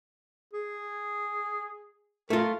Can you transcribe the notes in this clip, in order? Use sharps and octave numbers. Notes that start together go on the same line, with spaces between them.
G#4
A3 F4 A#4